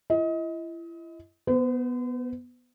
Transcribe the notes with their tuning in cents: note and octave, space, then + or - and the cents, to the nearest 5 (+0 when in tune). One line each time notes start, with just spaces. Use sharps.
E4 +35 D#5 +30
B3 +0 C5 -45